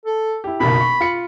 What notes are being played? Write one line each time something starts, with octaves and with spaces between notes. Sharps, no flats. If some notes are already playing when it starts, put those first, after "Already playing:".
A4
E4 G4
F#1 B1 B2 B5
C#6
F4 C#7